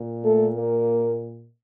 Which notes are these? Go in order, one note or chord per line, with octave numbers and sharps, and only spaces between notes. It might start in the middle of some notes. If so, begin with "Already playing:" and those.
Already playing: A#2
A3 A4
A#3 A#4